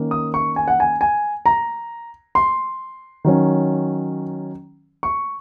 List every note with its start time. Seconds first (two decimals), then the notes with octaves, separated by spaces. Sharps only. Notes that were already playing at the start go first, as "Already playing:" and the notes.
Already playing: D#3 A#3 C#4
0.11 D#6
0.34 C#6
0.56 G#5
0.68 F#5
0.80 G#5
1.01 G#5
1.46 A#5
2.35 C6
3.24 D#3 F#3 C#4
5.03 C#6